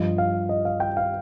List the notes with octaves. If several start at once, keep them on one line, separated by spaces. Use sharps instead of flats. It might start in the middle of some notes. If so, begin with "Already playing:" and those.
Already playing: G2 F3 D#5
F5
D#5
F5
G5
F5